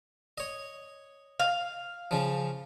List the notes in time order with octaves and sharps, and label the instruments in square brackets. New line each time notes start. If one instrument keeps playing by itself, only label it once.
[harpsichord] C#5 D#5
[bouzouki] F5
[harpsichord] C#3 F3